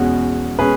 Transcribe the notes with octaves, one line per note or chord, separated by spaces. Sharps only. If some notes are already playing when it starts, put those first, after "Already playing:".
Already playing: E2 B2 G#3 C#4 F#4
B2 G#3 C#4 G#4 B4